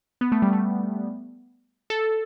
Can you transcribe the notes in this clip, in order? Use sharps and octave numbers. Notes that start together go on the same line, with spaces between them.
B3
A3
G3
A3
A4